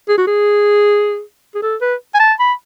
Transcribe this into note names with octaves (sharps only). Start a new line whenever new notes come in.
G#4
F#4
G#4
G#4
A4
B4
G#5
A5
B5